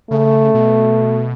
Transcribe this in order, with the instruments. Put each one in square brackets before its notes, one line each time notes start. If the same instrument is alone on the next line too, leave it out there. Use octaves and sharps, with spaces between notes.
[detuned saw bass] C#3 [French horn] A3
[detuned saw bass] B2